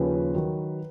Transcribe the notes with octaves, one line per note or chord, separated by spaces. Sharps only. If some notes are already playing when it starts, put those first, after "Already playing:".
Already playing: D#2 C#3 F3 B4
D#3 F#3